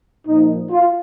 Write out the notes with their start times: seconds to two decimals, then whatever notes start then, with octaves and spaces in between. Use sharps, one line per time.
0.28 A#2 F3 D#4
0.72 F4